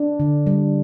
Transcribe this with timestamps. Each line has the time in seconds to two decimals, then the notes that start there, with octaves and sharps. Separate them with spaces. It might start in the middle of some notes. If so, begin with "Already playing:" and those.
Already playing: D4
0.20 D3
0.46 G3